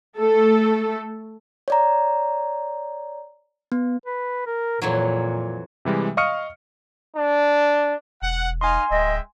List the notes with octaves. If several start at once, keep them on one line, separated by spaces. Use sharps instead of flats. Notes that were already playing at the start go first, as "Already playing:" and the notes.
A3 A4
C#5 D5 A#5
B3
B4
A#4
F2 A#2 E3 F#3
C3 E3 G3 G#3
D#5 F5 C#6 D#6 F6 C#7
D4
E1 F#5
D#4 D#5 F5 G#5 C6
D1 G#3 D#5 E5 G5